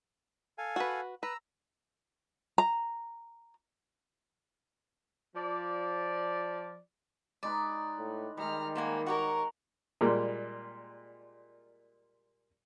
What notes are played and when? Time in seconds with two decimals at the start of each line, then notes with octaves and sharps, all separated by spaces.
0.58 A4 F5 G#5
0.76 F#4 B4
1.23 B4 A#5 E6
2.58 A#5
5.36 F3 D5
7.43 G#3 D#4 B4 D5
7.98 A2
8.37 D#3 G3 G#3 A#5 F6
8.75 A#3 C5 F#5 G#5
9.06 F#4 G4 A#4 C#5 F#5 A#5 C#6
10.01 A#2 G3 G#3 A#3